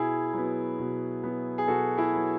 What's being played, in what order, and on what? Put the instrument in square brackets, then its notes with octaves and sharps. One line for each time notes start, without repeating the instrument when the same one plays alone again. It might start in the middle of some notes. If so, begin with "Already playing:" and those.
Already playing: [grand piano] B2 E4 G#4
F#3 B3
B2
F#3 B3
G#4
B2 F#4 A4
E4 G#4
F#3 B3